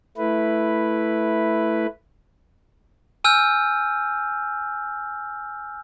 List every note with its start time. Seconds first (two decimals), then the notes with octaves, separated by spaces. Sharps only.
0.18 A3 E4 B4
3.24 G#5 E6 F6 G6